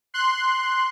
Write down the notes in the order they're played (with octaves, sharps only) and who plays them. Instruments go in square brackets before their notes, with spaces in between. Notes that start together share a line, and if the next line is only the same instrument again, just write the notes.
[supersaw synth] C6 F#6